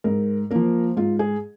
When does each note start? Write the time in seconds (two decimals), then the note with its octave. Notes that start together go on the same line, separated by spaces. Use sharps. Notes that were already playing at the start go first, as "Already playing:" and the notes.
0.04 G#2 A#4
0.51 F3 A#3 A#4
0.97 G#2 F4
1.19 G#4